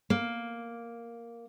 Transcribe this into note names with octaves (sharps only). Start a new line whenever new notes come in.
A#3